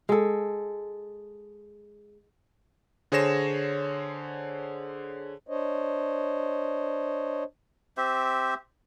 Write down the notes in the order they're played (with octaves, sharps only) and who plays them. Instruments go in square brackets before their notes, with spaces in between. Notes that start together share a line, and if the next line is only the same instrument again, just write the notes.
[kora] G#3 A4
[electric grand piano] D3 G#4 C5 C#5 A#6 E7
[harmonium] D4 C5 C#5 D#5
[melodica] C4 G4 C5 E5